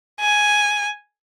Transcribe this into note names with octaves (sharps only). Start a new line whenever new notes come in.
G#5